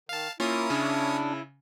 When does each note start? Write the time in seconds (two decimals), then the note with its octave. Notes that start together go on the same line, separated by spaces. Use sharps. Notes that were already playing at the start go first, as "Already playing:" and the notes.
0.09 D#3 F5 A5
0.40 A#3 C#4 E4 F4 C#5 D#6
0.70 C#3 D4